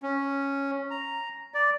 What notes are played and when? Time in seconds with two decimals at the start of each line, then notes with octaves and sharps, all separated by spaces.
0.03 C#4
0.91 A#5
1.54 D5